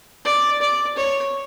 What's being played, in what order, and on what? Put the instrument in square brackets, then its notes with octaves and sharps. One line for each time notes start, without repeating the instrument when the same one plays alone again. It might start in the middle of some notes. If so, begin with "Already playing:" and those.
[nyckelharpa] D5
D5
C#5